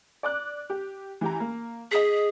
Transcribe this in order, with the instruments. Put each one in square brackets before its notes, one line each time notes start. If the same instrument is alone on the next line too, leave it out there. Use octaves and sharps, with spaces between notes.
[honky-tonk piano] D5 D6 F#6
G4
E3 G4 A#5
A#3
[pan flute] G#4 [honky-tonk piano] D#5 B6